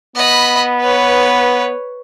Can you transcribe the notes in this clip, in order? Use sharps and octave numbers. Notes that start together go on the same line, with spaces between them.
B3 D#5 B5
B4 C#5